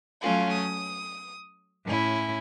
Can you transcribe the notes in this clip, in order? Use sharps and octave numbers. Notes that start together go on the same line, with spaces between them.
F#3 A3 C#4 F4
D#6
A2 C#4 E4